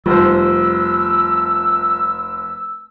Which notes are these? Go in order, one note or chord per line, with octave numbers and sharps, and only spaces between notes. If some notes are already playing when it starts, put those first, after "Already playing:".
F1 G3 F4 C5 E6